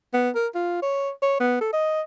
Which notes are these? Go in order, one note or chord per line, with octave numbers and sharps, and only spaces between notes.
B3
A#4
F4
C#5
C#5
B3
A4
D#5